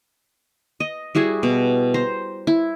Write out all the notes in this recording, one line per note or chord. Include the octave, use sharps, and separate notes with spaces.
D#5
G3 E4 F#4 G#4
B2
C5 A#5
E4